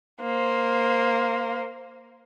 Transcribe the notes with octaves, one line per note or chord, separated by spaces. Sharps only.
A#3 C5